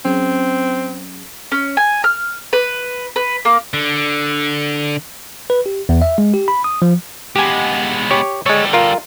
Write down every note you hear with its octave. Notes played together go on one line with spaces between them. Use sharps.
F#3 C4 C#4 G#4
C#4
G#5
F6
B4
B4
A#3
D3
B4
G4
E2
E5
G#3
G4
B5
D#6
F3
G#3 B3 G4 G#5
G4 C#5
G3 G#3 A4 C#5
F4 A#4